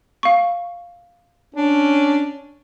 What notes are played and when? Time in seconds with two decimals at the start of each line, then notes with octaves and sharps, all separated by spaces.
0.23 F5 C#6
1.55 C#4 D4